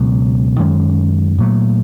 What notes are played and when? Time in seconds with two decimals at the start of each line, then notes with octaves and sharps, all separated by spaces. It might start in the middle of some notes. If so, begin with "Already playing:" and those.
Already playing: C#2 B2 F#3 B3
0.59 F#2 D#3 G#3 C#4
1.38 A#2 F#3 A3